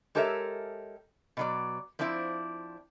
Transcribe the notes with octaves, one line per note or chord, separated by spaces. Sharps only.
G#3 G4 A4 A#4 C#5 E5
B2 F#3 D5
F3 C4 D4 E4 D5